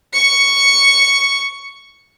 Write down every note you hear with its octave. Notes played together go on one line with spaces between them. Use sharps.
C#6 C#7